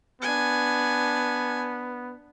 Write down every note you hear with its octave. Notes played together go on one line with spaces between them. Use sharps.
B3 D4 G#5